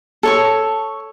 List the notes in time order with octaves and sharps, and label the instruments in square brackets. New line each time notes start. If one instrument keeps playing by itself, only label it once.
[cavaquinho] A4 C#5 C#6